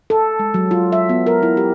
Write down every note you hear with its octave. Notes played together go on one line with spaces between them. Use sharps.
A4
G#3
F#3
F4
E5
B3
A#4
E4
G4